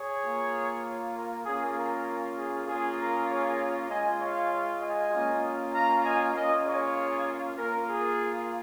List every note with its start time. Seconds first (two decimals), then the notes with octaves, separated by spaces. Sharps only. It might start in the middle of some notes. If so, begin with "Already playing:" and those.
Already playing: G#4 C#5
0.23 A#3 F4
1.15 A#4
1.45 A#3 C#4 F4 G#4
1.76 A#4
2.38 G#4
2.67 A#3 C#4 F4 G#4
2.98 A#4
3.29 G#4 C#5
3.90 G#3 F4 D#5 G#5
4.20 C#5 F5
4.82 D#5 G#5
5.13 A#3 C#4 F4
5.73 F5 A#5
6.04 D#5 G#5
6.35 A#3 C#4 F4 A#4 D#5
6.65 G#4 C#5
7.57 A#3 F4 A#4
7.88 G#4